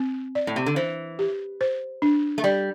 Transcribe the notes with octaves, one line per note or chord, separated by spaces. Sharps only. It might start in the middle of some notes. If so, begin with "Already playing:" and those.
Already playing: C4
D5
A2
C3
D3
E3 C5
G4
C5
D4
A3
G3 D5